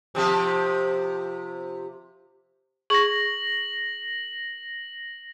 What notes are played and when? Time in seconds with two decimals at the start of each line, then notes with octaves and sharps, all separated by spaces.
0.15 C3 F3 G4
2.90 G#4 C#6 A#6 F#7